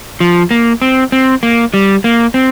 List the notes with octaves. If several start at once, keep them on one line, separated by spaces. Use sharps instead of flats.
F3
A#3
C4
C4
A#3
G3
A#3
C4